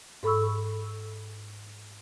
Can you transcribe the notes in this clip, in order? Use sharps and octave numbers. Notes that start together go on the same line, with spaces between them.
G#2 A4 B5 C#6 E6